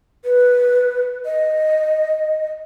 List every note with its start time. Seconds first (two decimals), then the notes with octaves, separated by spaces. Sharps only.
0.24 B4
1.25 D#5